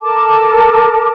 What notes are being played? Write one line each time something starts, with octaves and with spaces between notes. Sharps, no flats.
A4 A#4 A5 D6